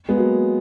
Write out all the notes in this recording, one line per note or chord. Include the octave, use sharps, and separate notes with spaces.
G#3 B3
F#3 A#3